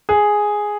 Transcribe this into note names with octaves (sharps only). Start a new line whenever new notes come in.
G#4